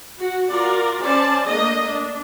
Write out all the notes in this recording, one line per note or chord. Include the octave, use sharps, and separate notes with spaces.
F#4
F4 F#4 A#4 D5
C#4 C5 D5 A5
A3 A#3 D4 D#5
D4